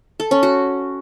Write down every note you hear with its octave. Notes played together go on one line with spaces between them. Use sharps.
A4
C#4
F#4